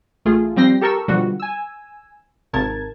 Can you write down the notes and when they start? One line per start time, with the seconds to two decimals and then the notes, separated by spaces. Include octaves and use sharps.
0.25 A1 A3 F4 G#4
0.56 F3 G3 C4 G5 A#6 C7
0.81 G4 A4 A#4 C#6 E6
1.08 B2 D3 F3 G3 F#4
1.40 G#5 E6
2.53 G#1 C3 A#4 A5 G#6